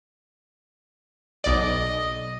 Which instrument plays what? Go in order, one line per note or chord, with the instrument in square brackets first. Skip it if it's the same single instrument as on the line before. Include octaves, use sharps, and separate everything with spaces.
[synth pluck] B1 D5 [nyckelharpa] D#5